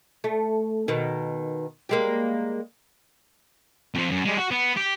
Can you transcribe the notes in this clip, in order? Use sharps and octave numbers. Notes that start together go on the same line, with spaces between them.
A3
B2 D#3
G3 G#3 A#3
F2 F3
F#2
G3 G#3
F#4
B3
G4